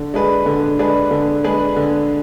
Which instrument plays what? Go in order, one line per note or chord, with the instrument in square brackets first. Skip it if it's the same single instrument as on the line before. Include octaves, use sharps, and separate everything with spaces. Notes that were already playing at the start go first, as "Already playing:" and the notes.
Already playing: [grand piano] D3
G#3 D4 G#4 B4
D3
G#3 D4 G#4 B4
D3
G#3 D4 G#4 B4
D3